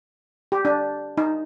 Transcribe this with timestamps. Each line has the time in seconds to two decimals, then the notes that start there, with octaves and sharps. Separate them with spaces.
0.52 G4
0.65 D4
1.18 D#4